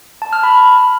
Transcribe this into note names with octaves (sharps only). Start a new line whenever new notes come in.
A5
F6
B5
B5